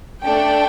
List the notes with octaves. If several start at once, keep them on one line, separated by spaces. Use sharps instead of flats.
A3 D4 A4 G5